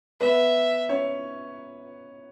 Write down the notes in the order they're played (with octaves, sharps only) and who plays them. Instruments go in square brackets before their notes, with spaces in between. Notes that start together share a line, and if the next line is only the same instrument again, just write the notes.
[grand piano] B3 B4 [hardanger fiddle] E5
[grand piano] C#4 C#5